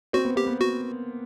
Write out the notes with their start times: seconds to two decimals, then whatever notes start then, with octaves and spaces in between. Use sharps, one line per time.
0.13 C4 F#4
0.25 B3
0.36 A#3 G4
0.47 B3
0.61 F#4